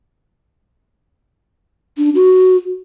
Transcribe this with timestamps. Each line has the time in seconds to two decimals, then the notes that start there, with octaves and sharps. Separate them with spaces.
1.98 D4
2.15 F#4